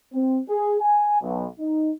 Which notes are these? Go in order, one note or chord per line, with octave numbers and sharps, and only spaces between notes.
C4
G#4
G#5
B1
D#4